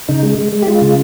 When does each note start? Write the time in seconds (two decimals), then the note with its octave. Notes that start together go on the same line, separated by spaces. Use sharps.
0.08 C#3 D#4
0.23 G#3
0.38 G#3
0.53 G#3
0.62 G4
0.67 G#3 F4
0.82 C#3